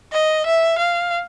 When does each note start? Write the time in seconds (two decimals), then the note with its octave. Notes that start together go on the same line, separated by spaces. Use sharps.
0.12 D#5
0.46 E5
0.78 F5